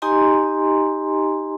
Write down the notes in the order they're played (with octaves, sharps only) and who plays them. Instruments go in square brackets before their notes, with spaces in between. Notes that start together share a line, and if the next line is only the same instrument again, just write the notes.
[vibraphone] D#4 G4 D#5 G#5 A#5 C6